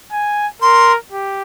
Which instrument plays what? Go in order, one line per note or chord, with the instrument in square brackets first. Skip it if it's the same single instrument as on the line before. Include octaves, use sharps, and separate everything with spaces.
[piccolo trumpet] G#5
[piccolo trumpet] A#4 [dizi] C6
[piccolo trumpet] G4